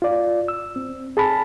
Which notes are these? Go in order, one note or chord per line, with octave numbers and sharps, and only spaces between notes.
F4 D5
E6
C4
G#4 A5 B5